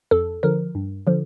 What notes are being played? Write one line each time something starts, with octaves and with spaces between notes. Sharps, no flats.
F2 A4
D3 F3 A#4
G2
D3 F3